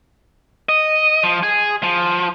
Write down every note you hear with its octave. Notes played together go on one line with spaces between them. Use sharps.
D#5
F3
G#4
F3